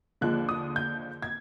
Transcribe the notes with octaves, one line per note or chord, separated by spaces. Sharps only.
D#2 D3 F3 G#3 F#6
D#6
G6
G#6